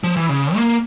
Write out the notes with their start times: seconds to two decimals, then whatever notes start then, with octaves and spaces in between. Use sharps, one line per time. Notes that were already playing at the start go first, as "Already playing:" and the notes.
0.04 F3
0.16 E3
0.29 C#3
0.55 A#3